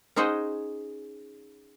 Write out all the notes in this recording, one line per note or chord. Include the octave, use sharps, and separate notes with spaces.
C#4 D#4 G#4 C5 D#5 F#5